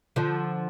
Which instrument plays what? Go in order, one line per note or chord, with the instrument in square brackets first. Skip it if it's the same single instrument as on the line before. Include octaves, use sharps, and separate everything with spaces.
[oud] D3 F3